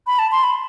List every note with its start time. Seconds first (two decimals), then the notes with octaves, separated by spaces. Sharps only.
0.07 B5
0.19 A5
0.32 C6
0.43 B5